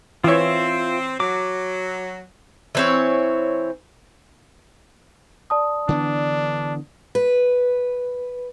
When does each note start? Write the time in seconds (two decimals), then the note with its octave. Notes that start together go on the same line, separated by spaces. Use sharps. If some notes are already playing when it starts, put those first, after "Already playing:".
0.24 E3 C4 F4 C#5 E5
1.20 F#3 D6
2.75 E3 C4 C#5
5.50 D5 A5 D#6
5.89 D3 E3 B3 D4
7.15 B4